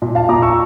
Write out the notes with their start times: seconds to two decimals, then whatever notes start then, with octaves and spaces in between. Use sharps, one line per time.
0.02 A#2
0.15 F5 A5
0.29 A#2 A#5 D6
0.42 C#6 E6